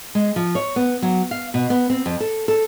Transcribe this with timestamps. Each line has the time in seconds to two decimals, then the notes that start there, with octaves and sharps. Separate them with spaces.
0.15 G#3
0.36 F3
0.55 C#5
0.76 B3
1.02 F#3
1.31 F5
1.54 B2
1.70 B3
1.90 C4
2.06 F2
2.20 A4
2.48 A4